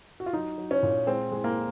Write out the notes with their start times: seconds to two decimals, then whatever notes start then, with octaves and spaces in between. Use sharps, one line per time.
0.20 F#4
0.26 F4
0.33 F#3 D#4
0.58 F#3
0.71 C#4
0.83 A#2
1.07 G#3 C4
1.32 G#3
1.44 A#3